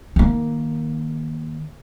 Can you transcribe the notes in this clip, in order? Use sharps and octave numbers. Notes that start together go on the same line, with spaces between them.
D#3 A#3